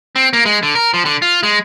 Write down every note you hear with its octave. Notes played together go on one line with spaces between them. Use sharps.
C4
A#3
G#3
D3
A#4
F3
D3
F4
G#3